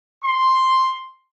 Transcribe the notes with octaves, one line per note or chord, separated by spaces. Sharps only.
C6